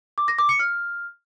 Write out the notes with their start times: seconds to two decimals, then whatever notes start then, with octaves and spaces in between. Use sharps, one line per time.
0.18 D6
0.28 A#6
0.39 D6
0.49 C#7
0.59 F6